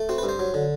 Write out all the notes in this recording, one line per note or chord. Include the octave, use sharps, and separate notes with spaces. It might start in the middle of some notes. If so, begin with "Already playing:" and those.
Already playing: A3
C4 F#4
B4
G2
C5
F#3
D3